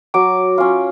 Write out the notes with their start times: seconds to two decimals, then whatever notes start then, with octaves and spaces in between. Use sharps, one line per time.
0.14 F#3 D6
0.58 C#4 F4